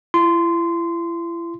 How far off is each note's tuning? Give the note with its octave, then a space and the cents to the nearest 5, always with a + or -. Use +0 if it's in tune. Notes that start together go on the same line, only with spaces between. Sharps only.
E4 +40 C6 -15